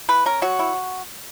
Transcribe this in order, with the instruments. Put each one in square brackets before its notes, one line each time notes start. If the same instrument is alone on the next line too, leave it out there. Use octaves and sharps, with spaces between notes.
[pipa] E3 B4
C#4 A#4
F#3 F#4
E4